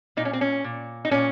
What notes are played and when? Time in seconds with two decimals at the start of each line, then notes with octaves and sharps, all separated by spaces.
0.17 A#2 D#4
0.25 C#4
0.33 C4
0.41 C#4
0.64 A#2
1.05 D#4
1.11 A#2 C#4